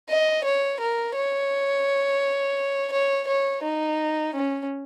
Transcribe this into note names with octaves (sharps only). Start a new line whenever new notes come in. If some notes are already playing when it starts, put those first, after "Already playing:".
D#5
C#5
A#4
C#5
C#5
C#5
D#4
C#4